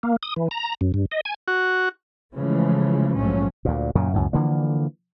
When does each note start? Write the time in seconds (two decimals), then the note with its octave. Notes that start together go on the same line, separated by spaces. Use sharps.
0.03 A#3
0.23 D#6
0.36 E3
0.51 A#5
0.81 F#2
0.94 G2
1.12 D#5
1.25 G#5
1.48 F#4
2.36 C#3 E3 F3 G#3 A3
3.17 A#1 G#2 F3 F#3 A3 C#4
3.65 D2 A#2
3.95 F#2 A#2 C#3
4.14 C#2 F#2 A2
4.33 D3 E3 F3 A#3